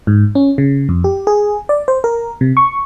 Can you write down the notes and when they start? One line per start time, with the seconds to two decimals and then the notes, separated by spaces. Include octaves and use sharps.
0.07 G#2
0.35 C#4
0.58 C#3
0.89 F2
1.04 G4
1.27 G#4
1.69 D5
1.88 C5
2.04 A#4
2.41 C3
2.57 C#6